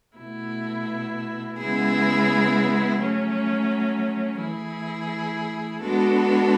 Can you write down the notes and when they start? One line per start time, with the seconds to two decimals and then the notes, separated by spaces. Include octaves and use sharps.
0.17 B2 A3 E4
1.59 C#3 G#3 B3 E4 G#4
3.00 F#3 A3 C#4
4.40 E3 A3 E4 G#4
5.80 G#3 B3 D4 F#4 A4